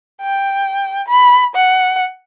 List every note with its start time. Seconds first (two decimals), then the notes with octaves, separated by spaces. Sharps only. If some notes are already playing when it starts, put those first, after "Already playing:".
0.22 G5
1.08 B5
1.56 F#5